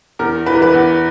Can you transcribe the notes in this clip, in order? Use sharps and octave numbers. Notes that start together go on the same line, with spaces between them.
E2 A#4
E3 B4
A#4
B4
E2